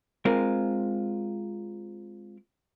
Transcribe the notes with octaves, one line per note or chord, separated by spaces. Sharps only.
G#3 C4 F4 A#4